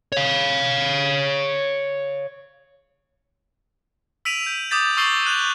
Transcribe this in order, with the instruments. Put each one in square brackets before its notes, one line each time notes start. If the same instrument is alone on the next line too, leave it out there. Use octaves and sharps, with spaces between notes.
[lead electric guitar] C#5 F5
[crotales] E6 B6 D7 D#7 F7
G6
D6 D#6 G6 A6 B6
C#6 D#6 E6 A6 C7 G7
F#6 G6 F7